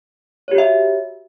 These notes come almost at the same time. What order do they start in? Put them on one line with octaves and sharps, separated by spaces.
C#5 G4 F#4 E5